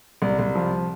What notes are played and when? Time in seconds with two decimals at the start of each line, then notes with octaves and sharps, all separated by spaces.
0.22 C2
0.39 C2
0.55 F3